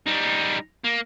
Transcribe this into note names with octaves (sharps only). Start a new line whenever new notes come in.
G3 D#4
A#3